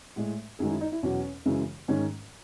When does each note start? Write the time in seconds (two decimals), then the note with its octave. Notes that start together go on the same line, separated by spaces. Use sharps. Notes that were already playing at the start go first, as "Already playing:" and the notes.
0.16 A2 G#3
0.59 F#2 D#3 G#3 G#4
0.70 E4
0.81 D#4
0.92 E4
1.03 E2 B2 F#3 C#4
1.45 F#2 C#3 E3 G#3
1.88 G#2 D#3 G#3 C#4